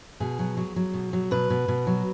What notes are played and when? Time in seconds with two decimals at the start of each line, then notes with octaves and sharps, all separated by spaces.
0.20 B2 G#4
0.39 F#3
0.57 F#3
0.76 F#3
0.94 B2
1.13 F#3
1.31 B2 B4
1.50 B2
1.68 B2
1.87 F#3